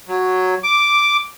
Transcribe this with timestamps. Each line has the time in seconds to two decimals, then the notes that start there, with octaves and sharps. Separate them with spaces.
0.08 F#3
0.64 D6